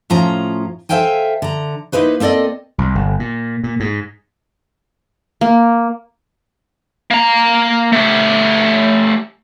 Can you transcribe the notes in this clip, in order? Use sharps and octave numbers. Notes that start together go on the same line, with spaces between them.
A2 F3 C#4 F4 A#5
A4 C5 E5 F5 G5 G#5
D3 A#5
A#3 D#4 E4 B4 C5
A#3 C4 A4 D5 D#5
C2
G1
A#2
A#2
G#2
A#3
A#3 A#5
A3 G4